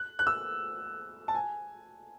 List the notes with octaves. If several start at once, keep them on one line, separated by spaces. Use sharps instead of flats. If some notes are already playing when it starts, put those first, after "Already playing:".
Already playing: F#6
F#6
E6
A5
G#5